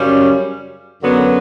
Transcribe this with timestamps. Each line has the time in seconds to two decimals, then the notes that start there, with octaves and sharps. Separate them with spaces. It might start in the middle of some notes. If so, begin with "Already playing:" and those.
Already playing: F#2 C#3 G3 C#4
1.02 F#2 D3 F#3 B3